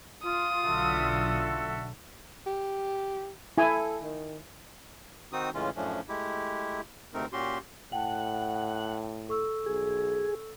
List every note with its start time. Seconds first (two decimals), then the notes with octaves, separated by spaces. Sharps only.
0.24 F4 D#6
0.64 B1 D3 F#4 A4 E5
2.46 G4
3.58 E4 A4 G#5
4.03 D#3
5.32 D#3 C4 D#4 F#4 D#6
5.54 A2 C#3 E3 G#3 C#4 F4
5.76 F#2 A2 F3 A3 C#4 D4
6.09 G#3 A3 E4 G4
7.14 D2 C3 A3 C4 D#4 A#4
7.33 A#2 C#4 F#4 G4 C6
7.92 A2 F#5 G5 A5
9.29 A4 C#6 E6
9.66 B1 G#4